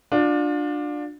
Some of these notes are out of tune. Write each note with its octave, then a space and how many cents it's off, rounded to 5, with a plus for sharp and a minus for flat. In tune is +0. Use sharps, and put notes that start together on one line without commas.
D4 +10 F4 +35